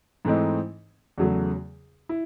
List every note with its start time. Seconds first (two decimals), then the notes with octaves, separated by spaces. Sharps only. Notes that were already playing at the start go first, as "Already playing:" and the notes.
0.25 G#2 E3 A3 C4 D#4
1.18 E2 C#3 F#3 A3
2.09 E4